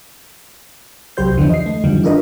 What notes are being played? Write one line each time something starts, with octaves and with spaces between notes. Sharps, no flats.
C2 F#3 G4 C5 G6
F2 D3 E3 F3 B3
D#5 C7
A3
F#2 D3 D#3 F3 G3
D4 E4 F4 A#4 B4 D#5